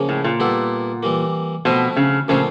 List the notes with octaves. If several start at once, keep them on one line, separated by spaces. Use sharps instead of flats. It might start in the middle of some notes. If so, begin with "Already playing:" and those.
Already playing: C#3 F3 A#3 C#4
A2
A#2
G3 B3 E4 A4
E3 G3 A#3
B2 F3 A3 C4 E4
C#3
A#2 C#3 F3 A3 C4 F4